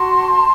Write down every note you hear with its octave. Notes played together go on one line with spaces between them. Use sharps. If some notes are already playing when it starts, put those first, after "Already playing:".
Already playing: F#4 A5 C6